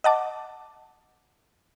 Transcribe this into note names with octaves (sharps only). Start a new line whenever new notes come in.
D#5 F#5 A5 D6